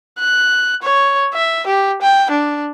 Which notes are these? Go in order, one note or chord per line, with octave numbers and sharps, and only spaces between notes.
F#6
C#5
E5
G4
G5
D4